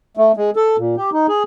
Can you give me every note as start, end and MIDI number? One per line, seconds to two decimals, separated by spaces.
0.17 0.32 57
0.37 0.50 56
0.56 0.77 69
0.78 0.95 46
0.97 1.10 67
1.13 1.27 63
1.28 1.43 68